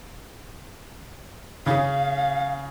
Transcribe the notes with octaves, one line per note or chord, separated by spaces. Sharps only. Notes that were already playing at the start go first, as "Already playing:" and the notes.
C#3 C#4 G#4 F5